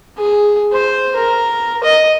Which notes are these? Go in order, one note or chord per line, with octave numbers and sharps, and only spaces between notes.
G#4
C5
A#4
D#5